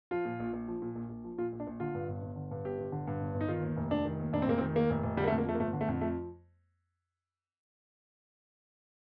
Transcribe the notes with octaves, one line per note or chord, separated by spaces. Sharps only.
F3 F4
A#2
A#1
A#1
F3
A#2
A#1
A#1
F3
A#2 F4
A#1
D4
A#1
D3 F4
G2
G1
G1
D3
G2
G1 G4
G1
D3
G2
G1
G1
D#4
D#3 F4
D#2
F1
F1 D4
D#3
D#2
F1 D4
C4
F1 A#3
C4
D#3
D#2 A#3
F1
F1
D3 G3
A#3
A3
F2
A#3
F3 A3
A#3
G1 A3
D3
A3
F2
F3 A3